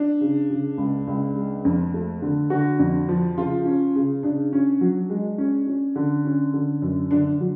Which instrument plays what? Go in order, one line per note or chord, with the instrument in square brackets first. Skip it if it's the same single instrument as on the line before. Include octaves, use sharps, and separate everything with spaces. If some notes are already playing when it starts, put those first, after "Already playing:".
Already playing: [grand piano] D4
[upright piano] C#3
C#3
C#2
C#2
G#3
F2
A3
D3
[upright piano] D3 [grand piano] F#4
[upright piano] F2
F3
[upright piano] C#3 [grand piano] F4
[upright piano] C#4
C#3
[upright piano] C#3 [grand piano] D4
[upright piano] C#4
F#3
G#3
C#4
C#4
D3
C#4
D3
F#2
[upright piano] D3 [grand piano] D4
[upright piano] F#3